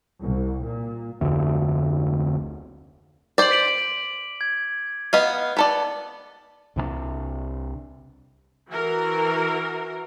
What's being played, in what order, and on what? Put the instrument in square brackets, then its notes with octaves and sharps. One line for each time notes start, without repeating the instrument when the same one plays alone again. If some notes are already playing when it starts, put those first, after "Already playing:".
[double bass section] C2
A#2
[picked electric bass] F1 D2
[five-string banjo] C5 D5 [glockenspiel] D6 F#7
[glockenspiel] B6 D7 F#7
G#6
[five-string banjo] B3 D#5 F5
B3 A4 D5
[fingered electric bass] C2 C3 G3 D4
[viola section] E3 F#4 A#4